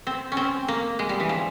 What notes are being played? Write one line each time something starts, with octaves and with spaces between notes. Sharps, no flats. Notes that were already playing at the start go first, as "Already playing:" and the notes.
C4
C#4
C4
A#3
G#3
G3
E3
F3